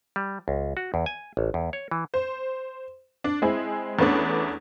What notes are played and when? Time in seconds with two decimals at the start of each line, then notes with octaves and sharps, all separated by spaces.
0.16 G3
0.48 C#2
0.77 F#4
0.94 E2
1.06 G#5
1.37 A1
1.54 E2
1.73 C#5
1.91 E3
2.14 C5
3.24 D4
3.42 G#3 C4 E4 G#4
3.99 E2 A3 B3 C#4 D4